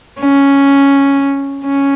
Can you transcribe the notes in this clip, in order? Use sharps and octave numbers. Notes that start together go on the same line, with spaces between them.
C#4
C#4